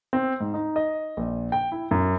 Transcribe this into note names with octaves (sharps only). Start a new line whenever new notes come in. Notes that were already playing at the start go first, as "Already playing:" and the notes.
C4
G#2
D#4
D#5
A#1
G5
E4
F#2